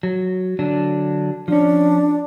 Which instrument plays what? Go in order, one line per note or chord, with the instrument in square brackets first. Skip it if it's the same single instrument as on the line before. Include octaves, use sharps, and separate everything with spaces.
[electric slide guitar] F#3
D3 F#3 D4
[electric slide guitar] F3 C#4 [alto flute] D4